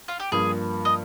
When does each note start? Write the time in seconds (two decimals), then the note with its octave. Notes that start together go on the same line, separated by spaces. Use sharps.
0.08 F4
0.20 G4
0.32 G2 F3 A#3 G#4
0.85 D#5